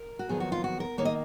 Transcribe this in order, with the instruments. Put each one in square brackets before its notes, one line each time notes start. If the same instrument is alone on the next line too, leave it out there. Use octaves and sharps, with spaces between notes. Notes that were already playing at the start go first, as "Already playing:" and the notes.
Already playing: [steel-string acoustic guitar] A#4
F#4
F2 D#3 F#3 B3 F4 G#4
F#4
F4
F#4
A#4
D#3 A#3 C#5
D#5